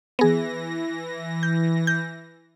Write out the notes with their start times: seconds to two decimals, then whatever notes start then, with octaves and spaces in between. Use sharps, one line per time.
0.19 E3 B3 G#4 A#6
1.43 G6
1.87 G6